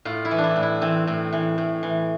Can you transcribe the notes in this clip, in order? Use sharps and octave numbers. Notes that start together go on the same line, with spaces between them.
A2 F4
E4
E3
D4
E4
A2
E4
E3 C4
A2
E3
A2
E3